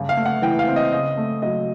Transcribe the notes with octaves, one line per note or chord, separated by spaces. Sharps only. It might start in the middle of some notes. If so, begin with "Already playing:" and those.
Already playing: G2 C#3
F5
A3
F#5
E3 G5
F5
C4
D#5
C#3 D#5
A3
F#3 D#5